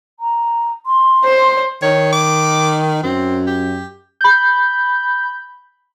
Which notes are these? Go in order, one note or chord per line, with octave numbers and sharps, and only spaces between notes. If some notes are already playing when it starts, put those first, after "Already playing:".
A#5
C6
C5
D#3 C#5
D6
F#2 C4
G4
B5 G6